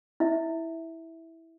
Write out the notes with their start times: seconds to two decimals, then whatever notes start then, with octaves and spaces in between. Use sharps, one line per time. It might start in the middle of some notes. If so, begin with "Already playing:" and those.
0.20 E4 E5